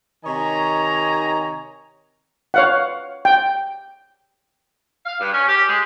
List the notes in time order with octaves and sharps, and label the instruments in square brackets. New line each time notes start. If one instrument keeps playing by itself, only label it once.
[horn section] C3 D#3 C#5 D#5 G#5 A#5
[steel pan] C#5 F5 F#5
G5
[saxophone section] F5
G2
C#4
G4
G#3